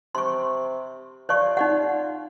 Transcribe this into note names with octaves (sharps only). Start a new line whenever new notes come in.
C3 C6 C#6
F4 C5 D5 C#6
D#4 D5 F#5